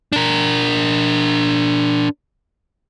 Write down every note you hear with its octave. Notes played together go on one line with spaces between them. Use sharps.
D4 A#4